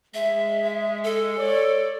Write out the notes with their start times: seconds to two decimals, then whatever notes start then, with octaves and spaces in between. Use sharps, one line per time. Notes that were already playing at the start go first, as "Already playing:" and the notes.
0.14 G#3 E5
1.04 A4
1.38 C#5 D5